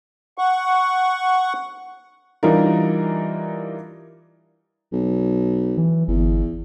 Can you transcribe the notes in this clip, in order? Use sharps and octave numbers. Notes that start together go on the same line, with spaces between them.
F#5 C#6
E3 G3 D4 D#4 F4 A#4
B1
E3
G1 E2